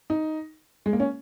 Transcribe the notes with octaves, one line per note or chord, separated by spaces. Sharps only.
D#4
G#3
A#3
C#4